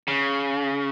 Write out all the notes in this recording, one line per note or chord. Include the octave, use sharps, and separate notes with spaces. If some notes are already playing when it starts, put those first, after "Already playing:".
C#3